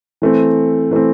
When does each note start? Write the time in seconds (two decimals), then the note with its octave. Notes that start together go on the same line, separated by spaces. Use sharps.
0.22 E3 A3 C4
0.91 E3 A3 C4